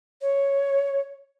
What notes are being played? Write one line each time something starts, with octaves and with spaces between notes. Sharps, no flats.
C#5